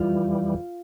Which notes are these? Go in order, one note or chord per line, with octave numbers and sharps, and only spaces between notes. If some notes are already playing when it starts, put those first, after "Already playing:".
Already playing: F2 E3 G3 F4